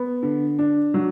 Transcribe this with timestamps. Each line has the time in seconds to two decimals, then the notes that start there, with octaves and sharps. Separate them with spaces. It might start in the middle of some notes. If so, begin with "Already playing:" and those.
Already playing: B3
0.23 D3
0.59 D4
0.94 F#3